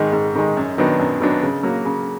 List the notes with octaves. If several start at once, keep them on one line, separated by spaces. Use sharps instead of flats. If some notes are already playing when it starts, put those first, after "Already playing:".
Already playing: G#2 D#3 G#3
G#2
D#3 G#3
F#2
D#3 F#3 B3 D4
F#2
D#3 F#3 B3 D4
C#3
F#3 A#3
C#3